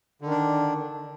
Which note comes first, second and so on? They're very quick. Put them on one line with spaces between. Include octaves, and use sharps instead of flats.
D3 D#3 D4